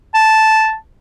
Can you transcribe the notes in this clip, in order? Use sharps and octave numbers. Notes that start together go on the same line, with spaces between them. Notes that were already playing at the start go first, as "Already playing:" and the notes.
A5